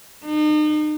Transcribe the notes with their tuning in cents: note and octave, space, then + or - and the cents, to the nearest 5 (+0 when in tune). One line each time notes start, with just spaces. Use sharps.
D#4 -40